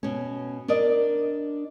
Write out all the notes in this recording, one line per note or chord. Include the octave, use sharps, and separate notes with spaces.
B2 C#4
D4 A#4 D5 D#5